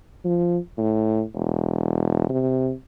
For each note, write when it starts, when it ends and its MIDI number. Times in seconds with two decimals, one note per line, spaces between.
0.25 0.58 53
0.78 1.23 45
1.35 2.27 28
2.29 2.72 48